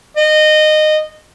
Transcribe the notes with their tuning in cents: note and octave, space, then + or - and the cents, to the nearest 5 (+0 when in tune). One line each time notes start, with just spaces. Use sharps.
D#5 -20